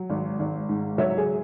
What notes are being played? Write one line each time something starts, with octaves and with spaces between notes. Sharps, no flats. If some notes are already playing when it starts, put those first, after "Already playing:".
Already playing: F#3
G#1
G#1
G#2
F#3 C#5 E5
G#4